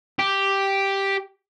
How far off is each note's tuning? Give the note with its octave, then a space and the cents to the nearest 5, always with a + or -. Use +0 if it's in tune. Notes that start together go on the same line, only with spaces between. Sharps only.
G4 +0